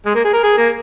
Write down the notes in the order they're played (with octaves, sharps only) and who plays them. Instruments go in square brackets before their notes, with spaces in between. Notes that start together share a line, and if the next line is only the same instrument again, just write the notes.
[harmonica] G#3
A#3
G#4
A#4
G#4
A#3